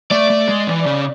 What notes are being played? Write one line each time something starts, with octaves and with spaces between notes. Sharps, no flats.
A3 D5
A3
G#3
E3
C#3